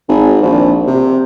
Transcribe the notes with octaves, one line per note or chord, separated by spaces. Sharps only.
G#1
A#1
C3